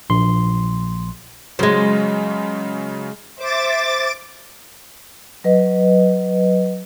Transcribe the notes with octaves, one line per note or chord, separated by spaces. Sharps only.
A#1 C6
C#3 F#3 G#3 C#4 C5
C5 E5 D6 A6
F#3 B4 D#5